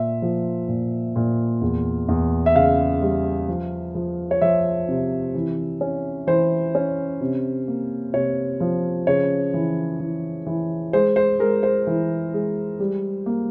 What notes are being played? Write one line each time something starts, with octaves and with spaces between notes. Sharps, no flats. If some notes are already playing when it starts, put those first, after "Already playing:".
Already playing: A#2 E5
F3
A#2
A#2
E2
E2
E5
C#3 F5
G3
F3
F3
C#5
F3 E5
C3
E3
C#4
E3 C5
C#4
C3
A#3
C3 C#5
F3
C#3 C#5
E3
E3
E3
G#3 C5
C5
G#3 A#4
C5
E3
G#3
G3
A#3